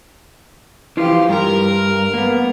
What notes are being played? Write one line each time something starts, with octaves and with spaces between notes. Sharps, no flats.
E3 F3 F4 G4 C6
G2 A#4
A#3 B3